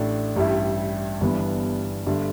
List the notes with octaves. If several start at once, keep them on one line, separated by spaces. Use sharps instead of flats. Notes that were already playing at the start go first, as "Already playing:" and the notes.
Already playing: A1 A2 A3 D4
A1 G2 G3 E4
G1 G2 E3 B3 D4
G2 D3 A3